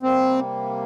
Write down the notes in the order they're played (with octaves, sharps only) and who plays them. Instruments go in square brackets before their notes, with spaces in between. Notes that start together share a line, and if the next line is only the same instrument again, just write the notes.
[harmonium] C3 G3 A#3 [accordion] C4